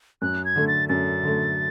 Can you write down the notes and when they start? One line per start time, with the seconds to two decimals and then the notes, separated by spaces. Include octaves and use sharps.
0.22 F#2 F#6
0.45 G#6
0.56 D3 A3
0.68 A6
0.89 F#2 A6
1.23 D3 A3